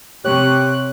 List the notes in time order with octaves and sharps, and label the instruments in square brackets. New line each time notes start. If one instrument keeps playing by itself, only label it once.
[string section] C3 [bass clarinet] G4 [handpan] C#5 [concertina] F#6